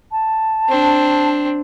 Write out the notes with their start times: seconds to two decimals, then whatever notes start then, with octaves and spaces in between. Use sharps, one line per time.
0.12 A5
0.69 C4 D4